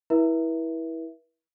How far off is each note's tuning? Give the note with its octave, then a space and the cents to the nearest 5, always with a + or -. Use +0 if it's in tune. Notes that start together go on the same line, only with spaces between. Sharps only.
E4 -15 B4 -40 E5 +0